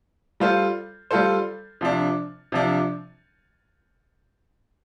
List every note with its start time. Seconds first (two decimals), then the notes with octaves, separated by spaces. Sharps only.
0.40 G3 F4 A4 C5
1.11 G3 F4 A4 C5
1.81 C3 F3 D4
2.52 C3 F3 D4